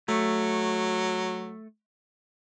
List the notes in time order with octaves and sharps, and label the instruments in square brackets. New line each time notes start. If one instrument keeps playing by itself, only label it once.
[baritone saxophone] F#3 [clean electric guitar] A3